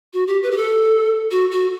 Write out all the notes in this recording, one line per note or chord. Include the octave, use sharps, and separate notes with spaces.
F#4
G4
B4
G4
A4
F#4
F#4